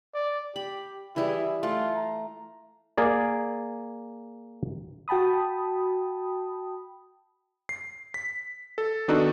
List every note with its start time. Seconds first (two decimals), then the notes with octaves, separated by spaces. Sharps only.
0.14 D5
0.56 G4 B5
1.16 E3 G3 E4 G#4
1.63 A3 F4
1.95 A#5
2.97 A#3 G#4 D5
5.08 F#4 G5 A5 B5 D#6
7.69 C7
8.14 B6
8.78 A4
9.08 D#3 B3 D4 D#4 F#4 A4